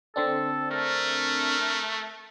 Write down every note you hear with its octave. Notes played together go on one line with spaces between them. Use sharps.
D3 C4 D4 A4
A3 A#4